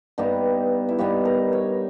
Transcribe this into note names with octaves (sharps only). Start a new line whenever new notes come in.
G2 G3 B3 D#4 G4
E4
G2 G3 B3 D#4 G4
A#4
C#5